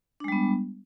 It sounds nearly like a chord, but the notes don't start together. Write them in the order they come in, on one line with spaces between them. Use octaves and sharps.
D4 G#3 G3 B3